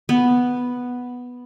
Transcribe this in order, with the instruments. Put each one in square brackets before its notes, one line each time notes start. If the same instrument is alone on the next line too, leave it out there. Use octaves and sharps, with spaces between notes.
[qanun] B3